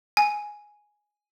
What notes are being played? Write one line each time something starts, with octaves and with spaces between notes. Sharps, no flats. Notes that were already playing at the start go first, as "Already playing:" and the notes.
G#5